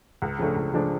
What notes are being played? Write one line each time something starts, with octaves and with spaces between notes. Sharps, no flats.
C#2
C#3 F3 A3 D4
C#2
C#3 F3 A3 D4